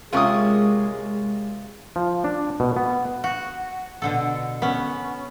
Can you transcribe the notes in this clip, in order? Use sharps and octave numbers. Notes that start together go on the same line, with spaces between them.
C3 G#3 A#3 C#4 F4 G#4 C#6 D#6
F3
D4
B2
B3
F#4
B2 D3 A4
B3 C#4